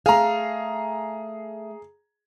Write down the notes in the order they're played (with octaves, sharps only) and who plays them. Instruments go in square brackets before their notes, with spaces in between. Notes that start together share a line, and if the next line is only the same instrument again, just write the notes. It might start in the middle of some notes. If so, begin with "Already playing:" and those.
[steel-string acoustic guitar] A3 F5 [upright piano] G#4 A#5